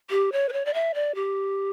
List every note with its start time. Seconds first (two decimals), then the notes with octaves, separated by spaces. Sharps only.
0.10 G4
0.32 C#5
0.49 B4
0.53 C#5
0.65 D5
0.74 E5
0.94 D5
1.15 G4